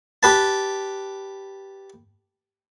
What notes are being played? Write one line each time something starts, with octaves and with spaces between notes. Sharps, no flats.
G4 B4 A5